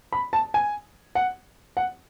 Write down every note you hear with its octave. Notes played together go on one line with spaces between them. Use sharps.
B5
A5
G#5
F#5
F#5